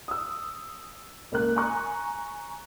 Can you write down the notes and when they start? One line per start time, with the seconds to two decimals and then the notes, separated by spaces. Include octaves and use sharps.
0.08 D#6 E6
1.32 C#2 A#3 A#4 F#6
1.56 G#5 A#5 C#6 F#6